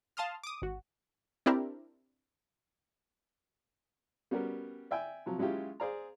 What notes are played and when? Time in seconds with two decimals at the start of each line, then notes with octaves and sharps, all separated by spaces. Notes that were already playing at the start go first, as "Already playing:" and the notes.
0.17 F5 A5 C6 D#6 F6
0.43 D6 D#6
0.62 G#1 F#4
1.46 C4 D4 E4 G4 A#4
4.31 G3 B3 C#4 F#4 G4 A#4
4.91 D5 E5 G5 G#5
5.26 C3 F3 F#3
5.38 F#3 G#3 C#4 E4 F4 G4
5.80 G#4 C5 D5 F5 A#5